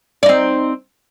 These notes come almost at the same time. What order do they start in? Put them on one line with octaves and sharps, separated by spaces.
D5 D#4 C4